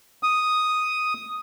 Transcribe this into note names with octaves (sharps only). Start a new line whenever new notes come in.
D#6